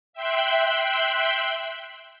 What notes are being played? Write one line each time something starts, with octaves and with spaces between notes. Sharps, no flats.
E5 G5 C6 F#6